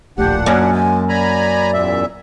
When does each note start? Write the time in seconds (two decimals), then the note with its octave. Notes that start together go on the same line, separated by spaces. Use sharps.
0.18 D1 A#1 A#2 A3 D4 G4 F#5
0.46 F#2 A#3 C#5
0.72 G#3 G#5
1.09 D5 G#5 A#5 B5
1.73 E2 A#2 E5